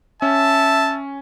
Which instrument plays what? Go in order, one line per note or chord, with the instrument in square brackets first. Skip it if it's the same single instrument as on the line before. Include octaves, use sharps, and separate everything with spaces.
[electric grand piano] C#4 [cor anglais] E5 [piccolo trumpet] A5